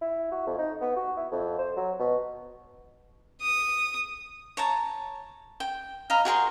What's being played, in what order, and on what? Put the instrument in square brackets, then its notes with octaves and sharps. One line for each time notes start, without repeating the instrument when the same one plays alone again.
[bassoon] E4
F#4
F2
D#4
B3
F#4
E4
F2
C5
F#3
B2
[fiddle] D#6
[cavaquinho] C#5 A5 A#5
G5
D#5 F5 A#5 B5
F#4 G#4 A#4 C5